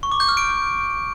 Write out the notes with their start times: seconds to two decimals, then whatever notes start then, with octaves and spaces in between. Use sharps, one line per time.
0.03 C#6
0.12 D6
0.20 G6
0.29 F6
0.37 D7